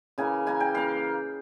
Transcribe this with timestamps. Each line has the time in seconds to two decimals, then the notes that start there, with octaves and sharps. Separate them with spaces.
0.18 C#3 E3 A#3 G#5
0.46 E3 A#3 G#5
0.60 G5
0.74 E3 A#3 F5